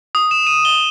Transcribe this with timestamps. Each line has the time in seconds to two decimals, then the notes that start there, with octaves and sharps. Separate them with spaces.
0.15 D#6
0.31 E7
0.47 D#7
0.65 G7